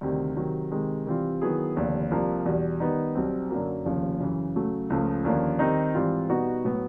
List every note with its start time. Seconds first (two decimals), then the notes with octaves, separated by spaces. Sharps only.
0.01 D2 C3 D#3 G3
0.37 C3 D#3 F#3
0.71 C3 D#3 G#3
1.06 C3 E3 G3 C4 F4
1.41 D#3 F#3 B3 E4 G#4
1.76 F1 D#2 D3
2.11 C2 C3 F3 A#3
2.46 E2 B2 G3
2.80 D#3 G3 B3 D#4
3.15 B1 B2 G3 C4
3.50 F#2 D3 F#3 A#3
3.85 F1 D#2 C#3 F3
4.20 F#2 C#3 E3
4.55 C#3 F#3 A3
4.90 C#2 C#3 F3 A3
5.25 D#2 D3 F3 A#3 C#4
5.59 D#3 G3 C4 D#4
5.94 G#2 E3 G3 C4 F4
6.29 B2 G3 B3 D#4 F#4
6.65 A2 F#3 B3